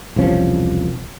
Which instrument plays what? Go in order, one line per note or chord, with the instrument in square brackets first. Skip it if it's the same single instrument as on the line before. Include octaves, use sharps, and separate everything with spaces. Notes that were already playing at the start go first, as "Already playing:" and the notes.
[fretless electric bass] E1 C2 F3 C#4